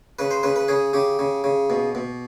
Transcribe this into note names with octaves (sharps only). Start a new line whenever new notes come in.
C#3 B4
C5
C#3 B4
B4
C#3 G#4
C#3 G4
C#3
C#3
B2
B2